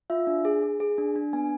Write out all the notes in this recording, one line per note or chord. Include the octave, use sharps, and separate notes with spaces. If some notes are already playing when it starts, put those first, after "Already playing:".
F4 E5
D4
G#4
G#4
G#4
D4
D4
B3 G#5